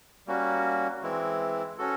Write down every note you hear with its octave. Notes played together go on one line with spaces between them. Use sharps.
G3 A#3 C#4 F#4
E3 G#3 C4 E4
C#4 F#4 A4